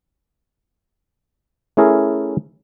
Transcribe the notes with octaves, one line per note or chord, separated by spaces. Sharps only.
A3 C#4 E4 G#4 A#4